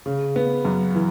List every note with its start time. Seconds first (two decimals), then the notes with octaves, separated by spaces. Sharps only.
0.06 C#3
0.36 B3
0.65 F#2
0.95 E3